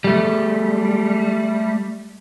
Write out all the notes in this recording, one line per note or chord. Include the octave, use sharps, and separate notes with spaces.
G3 A3